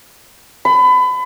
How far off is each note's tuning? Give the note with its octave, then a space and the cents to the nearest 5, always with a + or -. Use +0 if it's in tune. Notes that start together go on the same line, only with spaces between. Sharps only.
B5 +30